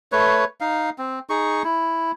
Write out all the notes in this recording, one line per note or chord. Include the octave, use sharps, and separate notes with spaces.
A3 B4 C#5
D#4 F5
C4
D#4 G#4 C#6
E4